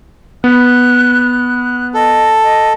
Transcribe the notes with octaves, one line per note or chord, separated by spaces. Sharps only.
B3 F#6
A4 D#5
D#5